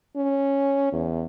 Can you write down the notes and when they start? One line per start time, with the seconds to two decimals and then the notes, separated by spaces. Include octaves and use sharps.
0.16 C#4
0.93 E2